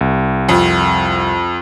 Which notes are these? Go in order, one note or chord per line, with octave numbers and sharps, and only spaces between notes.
C2
F2